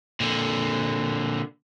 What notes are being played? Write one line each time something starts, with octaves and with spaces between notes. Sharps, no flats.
A#2 D3